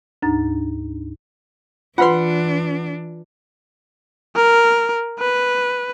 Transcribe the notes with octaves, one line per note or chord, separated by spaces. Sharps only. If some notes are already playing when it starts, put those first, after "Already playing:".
D2 G#2 D4 D#4 A#5 A6
E3 D4 F4 B4 F#5 B5 C6
A#4
B4